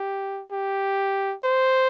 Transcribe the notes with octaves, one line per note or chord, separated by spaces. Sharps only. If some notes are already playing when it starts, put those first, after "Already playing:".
Already playing: G4
G4
C5